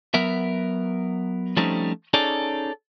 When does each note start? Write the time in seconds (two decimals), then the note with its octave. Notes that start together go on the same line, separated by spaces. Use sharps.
0.14 F#3 B3 A#4 E5
1.57 F3 G3 A3 C4 C#4 D#4
2.14 C#4 D#4 G#4 A4 C#5 D5